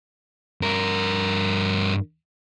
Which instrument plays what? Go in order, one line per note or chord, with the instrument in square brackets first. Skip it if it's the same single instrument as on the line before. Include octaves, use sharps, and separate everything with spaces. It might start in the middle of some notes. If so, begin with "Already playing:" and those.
[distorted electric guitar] G2 A#4